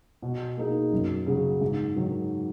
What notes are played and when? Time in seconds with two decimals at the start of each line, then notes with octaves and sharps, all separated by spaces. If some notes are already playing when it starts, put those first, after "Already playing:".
0.22 B2
0.57 A#3 D#4 G#4
0.92 F#2
1.26 C#3 F#3
1.61 G#2
1.96 D#3 F#3